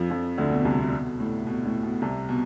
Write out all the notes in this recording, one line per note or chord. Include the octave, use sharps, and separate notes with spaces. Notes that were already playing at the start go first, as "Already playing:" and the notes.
Already playing: F2 F3
F2 F3
D2 D3
B2
C2 C3
B2
B2
A2
B2
A2
B2
C2 C3
B2